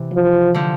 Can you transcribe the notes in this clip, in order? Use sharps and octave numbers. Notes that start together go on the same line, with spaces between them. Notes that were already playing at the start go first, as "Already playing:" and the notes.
Already playing: C3 E3
F3
D3 F3